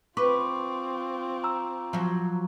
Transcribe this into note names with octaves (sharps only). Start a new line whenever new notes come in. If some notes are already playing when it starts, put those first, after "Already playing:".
C4 F4 B4 C#6 D6
A#5 E6
F3 F#3